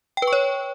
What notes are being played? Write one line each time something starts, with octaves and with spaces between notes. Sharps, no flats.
G5
B4
C#6
C#5